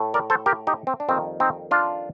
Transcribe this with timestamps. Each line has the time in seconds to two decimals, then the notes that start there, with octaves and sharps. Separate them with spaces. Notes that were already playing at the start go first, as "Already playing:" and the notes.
Already playing: A2 A3
0.14 A#4 D5
0.30 A4 C5
0.46 G4 A#4
0.67 D#4 G4
0.87 C4
1.00 D4
1.09 F2 D#3 G3 A#3 C4
1.40 C4 D#4
1.71 D4 F4